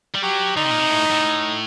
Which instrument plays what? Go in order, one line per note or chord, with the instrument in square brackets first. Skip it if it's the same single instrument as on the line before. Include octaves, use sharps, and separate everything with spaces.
[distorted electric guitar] G3
[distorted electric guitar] F#3 [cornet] G4
[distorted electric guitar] D3 [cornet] D#4
[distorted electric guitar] C3
A#2
C3
A2
A2